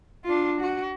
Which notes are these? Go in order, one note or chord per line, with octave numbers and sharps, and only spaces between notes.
D4 F4
F#4